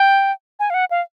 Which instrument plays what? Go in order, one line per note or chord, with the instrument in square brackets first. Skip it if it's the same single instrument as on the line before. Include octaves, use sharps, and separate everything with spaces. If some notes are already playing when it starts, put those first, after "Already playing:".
Already playing: [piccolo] G5
G#5
F5
F#5
F5